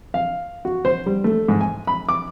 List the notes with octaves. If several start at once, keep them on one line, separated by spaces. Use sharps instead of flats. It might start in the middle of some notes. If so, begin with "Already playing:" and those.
F5
F#4
C5
G3
A3
G#2
G#5
B5
D6